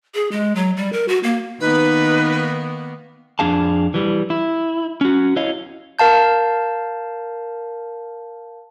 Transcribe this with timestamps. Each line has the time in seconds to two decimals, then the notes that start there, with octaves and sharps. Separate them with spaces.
0.15 G#4
0.32 G#3
0.55 F#3
0.77 G3
0.93 A#4
1.08 F#4
1.23 A#3
1.60 D#3 A#3 B3 D#4 B4
3.39 F2 D4 G#4 F5 A5
3.94 E3 G3
4.30 E4
5.01 C#4 F#4
5.36 E4 C#5 D#5 F5
5.99 A#4 F5 A5 G6